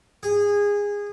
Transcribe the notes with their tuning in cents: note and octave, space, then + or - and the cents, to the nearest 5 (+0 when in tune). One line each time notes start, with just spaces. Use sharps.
G#4 -20